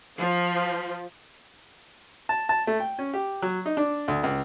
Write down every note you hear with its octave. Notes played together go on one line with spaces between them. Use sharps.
F3
A5
A5
A3
G5
C#4
G4
F#3
D#4
D4
D2
C#2